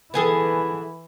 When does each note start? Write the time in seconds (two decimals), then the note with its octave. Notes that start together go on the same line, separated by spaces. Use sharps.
0.14 E3 B3 E4 G#4 A4